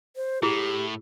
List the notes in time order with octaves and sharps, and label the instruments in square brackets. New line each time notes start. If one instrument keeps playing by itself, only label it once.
[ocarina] C5
[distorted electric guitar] A2 [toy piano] E4 G#4 [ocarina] G4